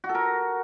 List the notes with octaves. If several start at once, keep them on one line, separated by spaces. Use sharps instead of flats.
F#4
A4
A#4